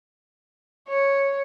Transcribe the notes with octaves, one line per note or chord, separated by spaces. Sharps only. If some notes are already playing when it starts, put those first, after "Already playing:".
C#5